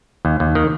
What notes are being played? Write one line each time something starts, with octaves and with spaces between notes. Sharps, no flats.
D#2
D#2
D#3